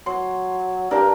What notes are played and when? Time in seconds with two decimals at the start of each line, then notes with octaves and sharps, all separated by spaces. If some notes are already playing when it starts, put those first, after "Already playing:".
0.06 F#3 C6
0.91 G2 D4 G4 A#4 F5 A5